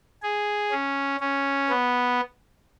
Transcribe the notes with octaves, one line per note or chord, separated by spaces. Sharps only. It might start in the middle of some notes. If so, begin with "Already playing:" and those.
G#4
C#4
C#4
B3